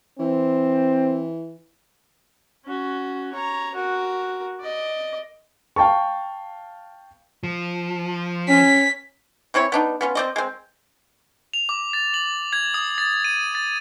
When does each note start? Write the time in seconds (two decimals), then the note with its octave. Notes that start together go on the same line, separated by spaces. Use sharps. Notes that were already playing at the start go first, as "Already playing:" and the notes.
0.20 E3 C4
2.65 C#4 F#4
3.33 C#5 A#5
3.74 F#4 A#4
4.60 D5 D#5
5.76 F5 G5 A5 C#6
7.43 F3
8.48 C#4 B6
9.54 E3 C4 E4 C#5
9.72 B3 D4 D#4
10.01 B3 C#4 F4
10.15 C4 D5 D#5
10.36 G#3 C4
11.53 F7
11.69 D6
11.93 A6
12.14 F#7
12.53 G#6
12.74 D#6
12.98 A6
13.24 D#7
13.55 A6